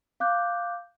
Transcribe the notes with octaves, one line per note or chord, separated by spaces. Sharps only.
F5 D6 F#6 G6